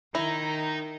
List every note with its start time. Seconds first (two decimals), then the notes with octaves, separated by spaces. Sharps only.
0.15 D#3 D#4 E4